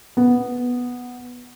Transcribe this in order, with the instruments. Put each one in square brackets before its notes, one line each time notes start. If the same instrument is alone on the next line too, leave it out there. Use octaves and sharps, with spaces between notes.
[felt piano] B3